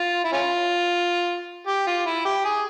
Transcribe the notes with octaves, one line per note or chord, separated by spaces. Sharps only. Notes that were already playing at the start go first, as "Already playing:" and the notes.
Already playing: F4
E4
C#4 F4
G4
F4
E4
G4
G#4